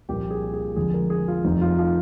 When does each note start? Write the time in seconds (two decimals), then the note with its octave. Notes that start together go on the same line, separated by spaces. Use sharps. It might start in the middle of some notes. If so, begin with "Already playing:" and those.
0.09 C2 A#2 F3 A#3 G4
0.31 G#4
0.53 G#4
0.76 F1 F2 D3 F3 G#3 G#4
0.94 A#4
1.10 G#4
1.28 F4
1.44 F1 F2 C3 D#4
1.61 F4
1.78 F4